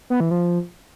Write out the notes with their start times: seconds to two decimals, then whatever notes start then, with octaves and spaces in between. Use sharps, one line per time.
0.10 B3
0.20 E3
0.31 F3